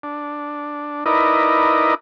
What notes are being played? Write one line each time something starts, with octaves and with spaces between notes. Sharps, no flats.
D4
D#4 E4 A#4 B4 D5 D#5